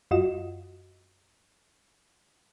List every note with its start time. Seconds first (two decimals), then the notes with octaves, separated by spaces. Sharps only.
0.11 F#2 F4 F#4 D#5 E7